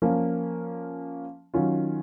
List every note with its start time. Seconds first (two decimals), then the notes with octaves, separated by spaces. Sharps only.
0.02 F3 A#3 C#4
1.54 D#3 F#3 C#4 F4